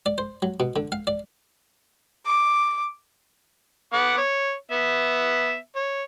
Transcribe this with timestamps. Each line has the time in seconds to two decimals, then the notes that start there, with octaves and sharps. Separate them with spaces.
0.06 D5
0.18 C5
0.42 F#3
0.60 B2
0.76 D3
0.92 F5
1.07 D5
2.26 D6
3.93 B3 F#5 D6
4.18 C#5
4.71 B3 E5
5.76 C#5